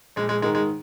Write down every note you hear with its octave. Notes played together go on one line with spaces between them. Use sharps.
A#1 G#3
G#3
G#2 D#3 G#3
G#3